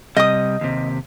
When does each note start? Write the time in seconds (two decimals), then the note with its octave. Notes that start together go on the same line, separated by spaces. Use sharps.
0.17 C3 G3 D#5 D#6
0.61 D#2 C3